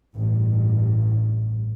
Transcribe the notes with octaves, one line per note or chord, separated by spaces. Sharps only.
A1 G2